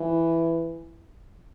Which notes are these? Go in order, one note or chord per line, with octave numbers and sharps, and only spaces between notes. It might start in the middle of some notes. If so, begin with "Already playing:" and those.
Already playing: E3